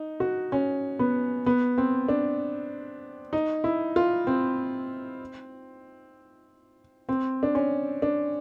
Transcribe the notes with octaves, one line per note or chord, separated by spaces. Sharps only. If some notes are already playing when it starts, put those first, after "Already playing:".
Already playing: D#4
F#4
C#4
B3
B3
C4
D4
D#4
E4
F4
C4
C4
D4
C#4
D4